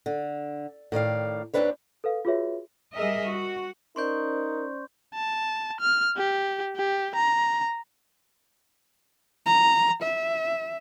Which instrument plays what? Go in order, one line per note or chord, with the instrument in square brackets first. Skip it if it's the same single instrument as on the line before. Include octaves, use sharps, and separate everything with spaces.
[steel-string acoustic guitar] D3
A2 D#3 D5 F5
D#2 D3 C4 D4 B4 C#5
[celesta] A4 B4 F5
F4 F#4 G#4 B4 C#5 E5
[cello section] G3 G#4 A#4 D#5 E5
F#4
[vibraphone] C#4 C5 D5 [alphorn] D#4 [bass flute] A#4 [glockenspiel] C6 C#6 G6
[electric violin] A5
F6
G4
G4
A#5
[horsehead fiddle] A#5
E5